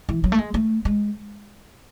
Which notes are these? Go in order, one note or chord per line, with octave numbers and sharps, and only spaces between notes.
E3
F#3
A3
G#3
A3
G#3